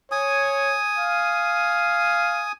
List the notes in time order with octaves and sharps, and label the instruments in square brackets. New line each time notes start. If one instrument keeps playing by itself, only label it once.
[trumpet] C#5 [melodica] G#5 D#6
[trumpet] F5